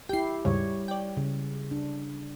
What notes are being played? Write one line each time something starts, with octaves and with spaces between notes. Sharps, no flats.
E4 G4 G5 C7
D#2 G#2 C#3 G3 C#5
D5 G5
C#3
D4